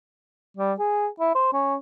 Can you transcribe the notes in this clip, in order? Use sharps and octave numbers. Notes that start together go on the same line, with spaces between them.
G3
G#4
E4
C5
C#4